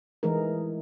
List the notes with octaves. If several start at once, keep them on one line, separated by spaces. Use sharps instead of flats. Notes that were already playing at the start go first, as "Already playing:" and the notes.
E3 G#3 A3 D#4 G#4 A#4